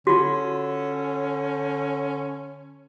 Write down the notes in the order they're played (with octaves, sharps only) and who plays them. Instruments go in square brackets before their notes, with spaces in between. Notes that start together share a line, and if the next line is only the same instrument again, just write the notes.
[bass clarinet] D3 [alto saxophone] C#4 [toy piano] F4 F#4